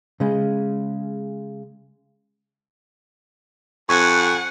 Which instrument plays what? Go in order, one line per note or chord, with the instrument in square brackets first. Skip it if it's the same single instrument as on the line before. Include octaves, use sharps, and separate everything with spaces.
[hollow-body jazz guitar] C#3 G#3
[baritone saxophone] F2 [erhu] F#5 [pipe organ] G#5 [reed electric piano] C#6